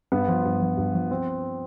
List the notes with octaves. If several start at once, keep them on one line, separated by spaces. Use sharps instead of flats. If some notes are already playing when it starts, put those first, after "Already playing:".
G2 B3
F3
G2
F3
G2
F3
C4